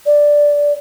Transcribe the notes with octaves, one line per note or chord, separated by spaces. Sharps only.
D5